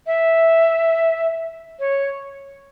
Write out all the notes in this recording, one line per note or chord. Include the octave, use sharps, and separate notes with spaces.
E5
C#5